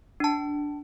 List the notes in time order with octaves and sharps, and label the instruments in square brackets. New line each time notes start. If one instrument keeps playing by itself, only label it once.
[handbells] D4 A5